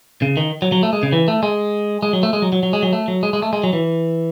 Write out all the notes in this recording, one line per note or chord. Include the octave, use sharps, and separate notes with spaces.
C#3
D#3
F#3
F#3
A3
G#3
C#3
E3
A3
G#3
G#3
F#3
A3
G#3
F#3
F#3
F#3
G#3
F#3
A3
F#3
G#3
G#3
A3
G#3
F#3
E3